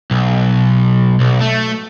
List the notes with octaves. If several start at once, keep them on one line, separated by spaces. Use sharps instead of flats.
B1
B1
A3